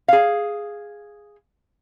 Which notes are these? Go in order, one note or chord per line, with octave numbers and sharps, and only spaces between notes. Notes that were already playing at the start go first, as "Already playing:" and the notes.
G#4 F5